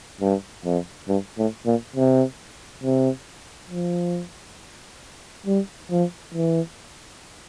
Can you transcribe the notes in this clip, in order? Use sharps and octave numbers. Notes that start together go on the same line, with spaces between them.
G2
F2
G2
A2
A#2
C3
C3
F3
G3
F3
E3